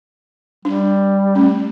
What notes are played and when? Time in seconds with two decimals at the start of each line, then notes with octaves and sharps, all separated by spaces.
0.65 G3 D4
1.35 A3 C#4